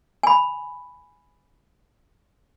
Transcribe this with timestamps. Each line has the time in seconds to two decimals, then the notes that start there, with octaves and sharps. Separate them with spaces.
0.23 G#5 B5